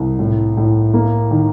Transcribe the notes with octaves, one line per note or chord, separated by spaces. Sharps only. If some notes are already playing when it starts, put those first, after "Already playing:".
Already playing: C2
A2
A2
A#3
D#3